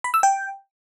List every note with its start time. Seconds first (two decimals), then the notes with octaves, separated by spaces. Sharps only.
0.04 B5
0.14 E6
0.23 G5